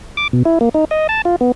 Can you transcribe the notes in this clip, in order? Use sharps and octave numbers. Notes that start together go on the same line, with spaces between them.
D6
B2
E4
A#3
D#4
D#5
A5
F4
B3